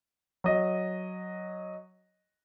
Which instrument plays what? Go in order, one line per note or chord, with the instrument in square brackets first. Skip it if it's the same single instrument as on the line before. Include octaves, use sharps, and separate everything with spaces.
[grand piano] F#3 D#5